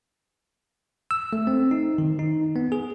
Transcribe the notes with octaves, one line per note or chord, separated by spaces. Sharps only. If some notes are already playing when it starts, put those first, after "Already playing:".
E6
A3
C4
D#4
D#3
D#4
B3
G#4